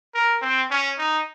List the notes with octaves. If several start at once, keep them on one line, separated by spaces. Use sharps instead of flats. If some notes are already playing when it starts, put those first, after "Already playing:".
A#4
C4
C#4
D#4